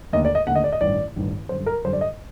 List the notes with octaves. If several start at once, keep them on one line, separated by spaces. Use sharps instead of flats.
D#2 D3 A3 D#5
D5
D#5
D#2 D3 A3 F#5
D#5
D5
D#5
A1 G2 D#3 D5
A1 G2 D#3
F#2 D3 G3 C5
A#4
F#2 D3 G3 C5
D5
D#5